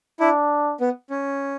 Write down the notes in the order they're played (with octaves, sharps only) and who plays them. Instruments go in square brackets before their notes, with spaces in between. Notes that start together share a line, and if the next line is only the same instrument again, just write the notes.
[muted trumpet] D4 [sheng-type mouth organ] E4
[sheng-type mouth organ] B3
C#4